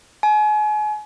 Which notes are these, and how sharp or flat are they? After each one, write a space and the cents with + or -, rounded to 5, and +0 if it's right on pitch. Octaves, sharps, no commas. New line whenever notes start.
G#5 +35